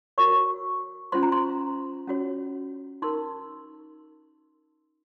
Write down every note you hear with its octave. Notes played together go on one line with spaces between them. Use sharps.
F#4 A#4 C#5 C#6
C#4 F4 C5 C6
A#5
C6
C#4 F#4 C#5
D#4 A#4 C6